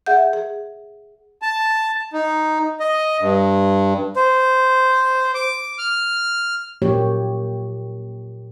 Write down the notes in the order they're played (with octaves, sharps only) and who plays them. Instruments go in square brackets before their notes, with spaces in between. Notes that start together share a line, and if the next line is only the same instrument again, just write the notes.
[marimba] G#4 E5 F#5 G6
G#4
[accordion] A5
D#4
D#5
G2
[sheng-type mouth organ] C5
D6
F6
[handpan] A#2 F#3 A#3 G4 C#5